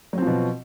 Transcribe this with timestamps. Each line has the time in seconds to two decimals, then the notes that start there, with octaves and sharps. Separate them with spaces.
0.13 F#3
0.18 C4
0.22 F3
0.27 B2